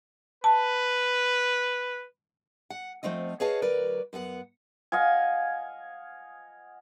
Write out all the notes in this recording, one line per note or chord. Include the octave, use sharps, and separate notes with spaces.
B4 A5
F#5
F3 A3 C4 F4 D#5
G#4 B4 C#5 D#5 F5 A5
D2 F#3 A#4 B4 D5
F#2 B3 A4 F#5
D#5 F5 F#5 G#5